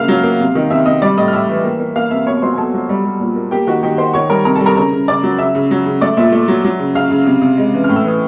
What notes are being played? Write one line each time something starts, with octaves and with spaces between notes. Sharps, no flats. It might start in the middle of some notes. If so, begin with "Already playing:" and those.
Already playing: C#3 A#3 E5 F5 F6
F#3
A#3
C3
D#3
C3 E5 E6
C3 D#5 D#6
G3 D5 D6
A2 D#5 D#6
F6
A2 E5 E6
E3
A#3
A#3
A#3 F5 F6
C3 E5 E6
B2 C#5 C#6
C#6
F#3 C5 C6
G#5
B2 A4 A5
F#3
G3
G3
A#2
A#3
A#3 G4 G5
D#3 F#4 F#5
D#3 G4 G5
A#3 C5 C6
D#3 C#5 C#6
G3 A#4 A#5
C3 A#4 A#5
A4 A5
G3
A#4 A#5
C#3 A#4 A#5
C#3
C#3 D5 D6
F#3
C#3 E5 E6
C#3
F#3
C#3
A3 D5 D6
A#2 E5 E6
A3
F#3
F#3
C#3
C#3 F5 F6
C#3
C3
C3
G#3
E3
F6
A2
E6
E3 D#6